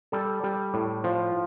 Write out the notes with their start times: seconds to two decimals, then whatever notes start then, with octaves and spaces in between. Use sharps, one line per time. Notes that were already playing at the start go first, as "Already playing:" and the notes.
0.12 G3 A4
0.43 G3
0.74 A2
1.04 F3